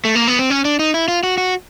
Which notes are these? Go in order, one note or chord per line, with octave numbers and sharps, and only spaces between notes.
A3
A#3
B3
C4
C#4
D4
D#4
E4
F4
F#4
F#4